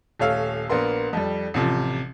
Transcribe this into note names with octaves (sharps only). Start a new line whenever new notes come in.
D#1 A3 C#5 F5 E6
A#1 A#3 B3 A#4 C6
F2 G3
A1 C3 F3